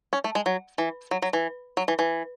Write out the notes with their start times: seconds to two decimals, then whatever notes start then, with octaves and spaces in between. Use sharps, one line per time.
0.13 C#4
0.24 A3
0.35 G#3
0.46 F#3
0.78 E3
1.11 F#3
1.22 F#3
1.33 E3
1.77 F#3
1.88 E3
1.99 E3